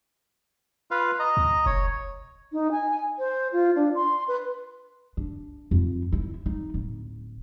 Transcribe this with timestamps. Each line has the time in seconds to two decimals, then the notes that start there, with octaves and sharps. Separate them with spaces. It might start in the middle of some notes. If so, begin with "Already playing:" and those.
0.91 F4 B4 F5
1.19 D#5 A#5
1.37 D2
1.66 F1 C#5
2.53 D#4
2.72 G#5
3.19 C5
3.53 F4
3.76 D4
3.95 C6
4.28 B4
5.17 D4
5.71 F2
6.12 E4
6.46 D#4
6.74 D1